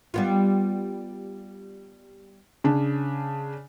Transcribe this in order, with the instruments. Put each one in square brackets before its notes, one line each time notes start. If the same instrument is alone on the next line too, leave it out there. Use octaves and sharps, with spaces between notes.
[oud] G3 B3 F4
[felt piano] C#3 D4